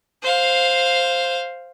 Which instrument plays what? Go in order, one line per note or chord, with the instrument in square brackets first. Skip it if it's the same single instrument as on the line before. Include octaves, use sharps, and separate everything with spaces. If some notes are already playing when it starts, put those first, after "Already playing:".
[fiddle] C5 F5